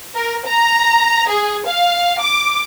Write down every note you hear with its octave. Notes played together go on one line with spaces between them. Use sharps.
A#4
A#5
G#4
F5
D6